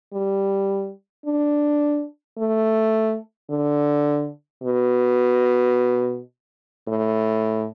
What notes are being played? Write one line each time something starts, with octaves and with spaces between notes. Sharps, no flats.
G3
D4
A3
D3
B2
A2